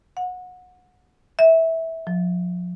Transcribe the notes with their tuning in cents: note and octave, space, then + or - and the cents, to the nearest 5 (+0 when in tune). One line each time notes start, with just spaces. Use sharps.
F#5 -25
E5 -15
F3 +35